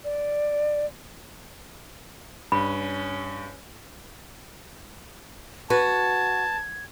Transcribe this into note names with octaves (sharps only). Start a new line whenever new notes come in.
D5
G2 C#4 B5
F#4 B4 A5 G#6